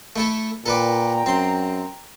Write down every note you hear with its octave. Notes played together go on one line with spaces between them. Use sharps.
A3 E4 A4
A#2 A4 B4 D5 G5 A#5
F#2 C4 C6